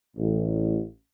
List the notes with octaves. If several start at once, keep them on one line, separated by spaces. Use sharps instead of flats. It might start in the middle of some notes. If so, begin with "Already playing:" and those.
A1